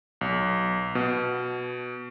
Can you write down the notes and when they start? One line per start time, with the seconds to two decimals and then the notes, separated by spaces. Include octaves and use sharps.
0.21 B1
0.95 B2